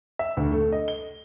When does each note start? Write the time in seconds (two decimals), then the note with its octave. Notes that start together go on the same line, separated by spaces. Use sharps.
0.19 E5
0.37 D2
0.52 A3
0.72 D#5
0.88 G7